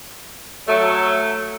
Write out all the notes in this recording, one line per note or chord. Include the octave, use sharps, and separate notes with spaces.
F#3 A3